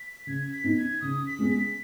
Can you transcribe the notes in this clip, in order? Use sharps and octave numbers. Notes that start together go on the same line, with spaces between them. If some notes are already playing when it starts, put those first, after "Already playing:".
Already playing: B6
C#3 G#6
B6
B3 D#4
G#6
C#3 D#6
B6
G#3 B3 G#4
B6